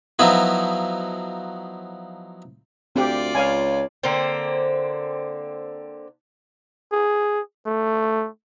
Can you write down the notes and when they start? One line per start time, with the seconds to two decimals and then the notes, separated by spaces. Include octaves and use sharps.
0.19 F3 F#3 B3 D#4 E4 F#4
2.96 D2 C4 F4 G4 D5
3.35 C#2 C#5 F5 G#5
4.03 D3 A#3 C4 C5
6.92 G#4
7.66 A3